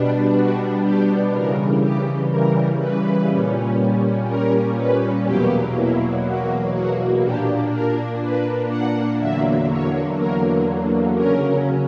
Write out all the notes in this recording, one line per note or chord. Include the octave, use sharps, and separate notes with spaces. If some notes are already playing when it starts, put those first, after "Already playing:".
Already playing: B2 G3 B3 D4
F#4
G4
C#3 E3 G3 A#4
G4
A#4
B4
A#2 G3 C#4
A#4
B4
E2 B2 F#3 A#3 G4
E4
F#4
F#4
A#2 A#3 D4 G4
A#4
B4
F#5
E2 D3 F#3 A#3 E5
C#5
A#4
C#3 F#3 C#4 A#4